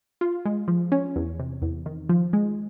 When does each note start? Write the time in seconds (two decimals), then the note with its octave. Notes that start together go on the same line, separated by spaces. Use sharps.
0.21 F4
0.45 G#3
0.68 F3
0.92 C#4
1.16 E2
1.39 C3
1.62 E2
1.86 D#3
2.09 F3
2.33 G#3